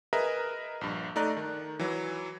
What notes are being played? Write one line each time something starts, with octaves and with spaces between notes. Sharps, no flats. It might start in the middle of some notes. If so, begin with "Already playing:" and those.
G#4 A#4 B4 D#5 E5 A#5
A#1 G2
A3 D#4 D5 A#5 F#6
D#3
E3 F#3